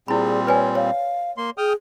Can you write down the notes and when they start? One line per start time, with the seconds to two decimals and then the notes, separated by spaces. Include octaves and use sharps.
0.08 A#2 G3 C4 E4 G#4 B5
0.47 B4 C#5 D5 G#5
0.75 C#5 F5
1.38 A#3 C6
1.58 G#4 G5 D#6 F6